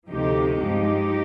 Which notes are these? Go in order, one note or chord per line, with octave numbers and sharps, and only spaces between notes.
D2 C3 F3 D#4 G4
G2 F3 G#3 D#4 G4